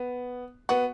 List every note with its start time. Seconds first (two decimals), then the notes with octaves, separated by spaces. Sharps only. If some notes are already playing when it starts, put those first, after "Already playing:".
Already playing: B3
0.69 B3 F#4